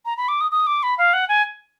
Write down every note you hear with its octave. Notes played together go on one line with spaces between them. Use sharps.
A#5
B5
D6
D#6
D#6
D6
B5
F5
F#5
G#5